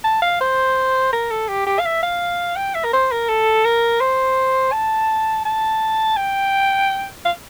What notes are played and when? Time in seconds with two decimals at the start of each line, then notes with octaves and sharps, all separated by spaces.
0.04 A5
0.22 F5
0.41 C5
1.13 A#4
1.31 A4
1.48 G4
1.66 G4
1.79 F5
1.85 E5
2.02 F5
2.56 G5
2.75 E5
2.84 A#4
2.93 C5
3.11 A#4
3.28 A4
3.65 A#4
4.00 C5
4.72 A5
5.45 A5
6.16 G5
7.25 F5